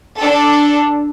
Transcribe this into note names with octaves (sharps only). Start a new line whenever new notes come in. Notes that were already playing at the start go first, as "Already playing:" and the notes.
D4 A4